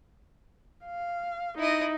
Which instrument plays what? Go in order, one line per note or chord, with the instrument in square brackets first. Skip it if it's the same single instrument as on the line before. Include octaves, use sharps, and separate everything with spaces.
[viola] F5
[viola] D#4 [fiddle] E4 D#5